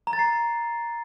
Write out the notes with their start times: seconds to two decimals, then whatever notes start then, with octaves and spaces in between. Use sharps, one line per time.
0.07 A#5
0.13 A6
0.19 C7